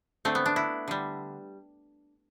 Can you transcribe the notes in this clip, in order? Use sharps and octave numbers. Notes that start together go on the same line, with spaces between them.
D3 A3 C4
B3
D4
E4
D3 G3